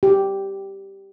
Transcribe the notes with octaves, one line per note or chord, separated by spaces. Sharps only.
G4